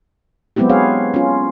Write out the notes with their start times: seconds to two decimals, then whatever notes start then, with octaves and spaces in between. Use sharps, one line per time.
0.56 F#3 G#3 B3 C4 E4 G4
0.69 D4 G#4 C#5 F5
1.14 C#4 F4